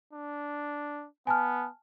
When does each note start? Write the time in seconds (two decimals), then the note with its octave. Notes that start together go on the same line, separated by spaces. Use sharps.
0.13 D4
1.27 B3 G#5 A5 F6